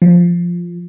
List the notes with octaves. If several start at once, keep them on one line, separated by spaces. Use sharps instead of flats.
F3